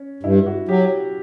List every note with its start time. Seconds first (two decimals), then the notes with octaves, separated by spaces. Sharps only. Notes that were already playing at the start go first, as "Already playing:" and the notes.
Already playing: C#4
0.23 G2 E4
0.46 F#4
0.69 F#3 G4